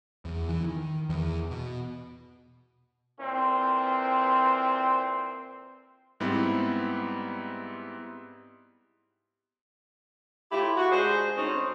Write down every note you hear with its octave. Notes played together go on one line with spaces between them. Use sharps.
E2
E3
D#3
E2
B2
A#2 E3 C4
G#2 G3 B3 C4 E4
A2 E4 F4 G4
F#4
G#3 D4 G#4 C5
D2 C4 C#4 D#4